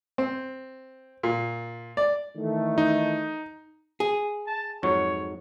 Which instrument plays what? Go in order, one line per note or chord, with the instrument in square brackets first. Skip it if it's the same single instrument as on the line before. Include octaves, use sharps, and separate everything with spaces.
[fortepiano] C4
A#2
D5
[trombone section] D#3 E3 A3
[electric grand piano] D#4
[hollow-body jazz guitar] G#4
[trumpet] A5
[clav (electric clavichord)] F2 G#2 F#3 [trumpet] C#5